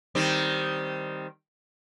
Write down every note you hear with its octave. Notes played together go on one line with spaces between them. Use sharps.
D#3 G3 C4